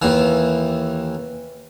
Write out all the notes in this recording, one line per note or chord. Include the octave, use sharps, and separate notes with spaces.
D#2 E3